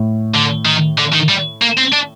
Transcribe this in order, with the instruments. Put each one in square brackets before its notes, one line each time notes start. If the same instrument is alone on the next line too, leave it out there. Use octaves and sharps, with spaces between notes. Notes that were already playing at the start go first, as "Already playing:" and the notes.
Already playing: [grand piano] A2
[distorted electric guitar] D3
D#3
D3
D#3
G3
A#3
C4
D4